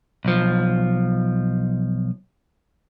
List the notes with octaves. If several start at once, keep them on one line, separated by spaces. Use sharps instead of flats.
B1 F3